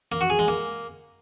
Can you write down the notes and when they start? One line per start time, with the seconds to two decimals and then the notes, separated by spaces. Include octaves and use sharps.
0.12 A#3
0.21 F#4
0.30 G#4
0.39 G#3
0.48 A#3